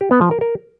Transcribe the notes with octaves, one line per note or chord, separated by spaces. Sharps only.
G4
B3
F3
A#4
A#4